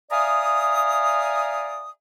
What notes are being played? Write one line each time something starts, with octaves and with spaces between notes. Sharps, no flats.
D5 E5 F5 G#5 A#5 D#6